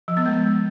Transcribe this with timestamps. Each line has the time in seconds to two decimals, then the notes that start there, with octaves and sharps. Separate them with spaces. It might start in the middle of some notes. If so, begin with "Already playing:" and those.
0.08 F3
0.17 B3
0.26 G#3